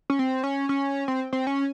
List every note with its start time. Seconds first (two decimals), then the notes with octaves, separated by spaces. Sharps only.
0.10 C#4
0.19 C4
0.43 C#4
0.69 C#4
1.08 C4
1.33 C4
1.47 C#4